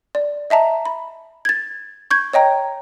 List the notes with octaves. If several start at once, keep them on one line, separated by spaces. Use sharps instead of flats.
D5
D#5 E5 A5 A#5
B5
G#6 A6
C#6 G6 G#6
C#5 D#5 G5 A#5